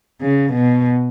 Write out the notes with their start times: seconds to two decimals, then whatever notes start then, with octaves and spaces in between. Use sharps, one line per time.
0.21 C#3
0.53 B2